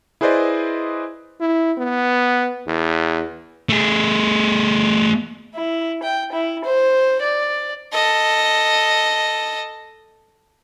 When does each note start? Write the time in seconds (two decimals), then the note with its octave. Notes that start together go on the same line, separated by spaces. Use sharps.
0.21 E4 G#4 B4 C5 D5 D#5
1.40 E4
1.78 B3
2.67 E2
3.69 A3 G#4
5.55 E4
6.03 G5
6.32 E4
6.64 C5
7.22 D5
7.93 A4 D#5